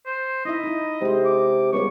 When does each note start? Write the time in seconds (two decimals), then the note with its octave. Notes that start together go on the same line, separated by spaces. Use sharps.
0.06 C5
0.45 D#4 E4 D#5 E5
0.64 D#4 E4
1.01 C3 G#3 C5
1.25 D6
1.73 C#2 G3 B3 C#5 C#6